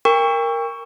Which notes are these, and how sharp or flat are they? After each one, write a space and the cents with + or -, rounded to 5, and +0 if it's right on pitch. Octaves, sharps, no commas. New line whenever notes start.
A#4 +0 G5 +35 C#6 +10